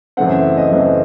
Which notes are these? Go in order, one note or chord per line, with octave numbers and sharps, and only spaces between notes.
F#2 C#3 E3 A3 C4 F#5
E5
D#5
F#2 C#3 E3 A3 C4